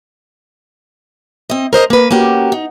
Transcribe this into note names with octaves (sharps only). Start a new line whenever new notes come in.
C4 D#5
A#4 C5 D#5 A#5
A#3 B4
A#3 C#4 F#4 G4
D#4